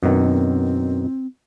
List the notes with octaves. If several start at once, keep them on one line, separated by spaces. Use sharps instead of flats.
F#2 B2 D#3 C4